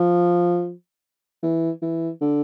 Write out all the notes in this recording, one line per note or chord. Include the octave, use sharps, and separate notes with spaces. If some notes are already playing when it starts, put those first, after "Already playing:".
Already playing: F3
E3
E3
D3